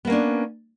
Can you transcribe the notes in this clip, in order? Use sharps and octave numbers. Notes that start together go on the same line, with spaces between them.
A#3 B3 C#4 D4